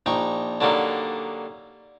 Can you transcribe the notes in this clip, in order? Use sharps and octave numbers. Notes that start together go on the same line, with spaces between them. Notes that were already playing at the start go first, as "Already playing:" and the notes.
A#1 D#4 G5 C#6
D3 F#3 G3 A#3 D#4